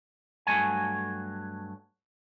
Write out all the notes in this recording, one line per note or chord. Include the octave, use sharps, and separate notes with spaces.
G2 F#3 G#3 A3 G#5